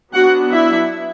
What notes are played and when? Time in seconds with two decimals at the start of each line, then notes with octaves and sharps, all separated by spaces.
0.13 F#3 B3 D4 F#4 F#5
0.51 E4 E5